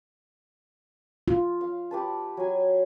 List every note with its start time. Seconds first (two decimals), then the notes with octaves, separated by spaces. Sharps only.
1.28 F4
1.61 F5
1.91 G4 B4 A5
2.37 F#3 G#5